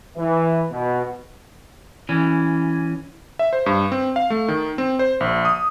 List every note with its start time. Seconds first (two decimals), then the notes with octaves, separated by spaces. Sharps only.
0.16 E3
0.71 B2
2.09 E3 C#4
3.39 E5
3.53 C5
3.66 G2
3.92 C4
4.16 F5
4.30 A3
4.48 D#3
4.78 C4
4.99 C5
5.20 A#1
5.45 D#6